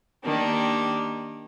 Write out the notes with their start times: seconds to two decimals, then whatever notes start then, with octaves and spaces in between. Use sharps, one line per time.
0.25 D#3 A#3 D4 G4